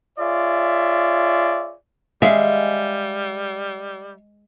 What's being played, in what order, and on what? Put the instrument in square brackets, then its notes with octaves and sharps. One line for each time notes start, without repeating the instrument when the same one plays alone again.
[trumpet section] F4 G#4 C#5 D5 E5
[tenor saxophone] G3 [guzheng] G#3 [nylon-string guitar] E5 F5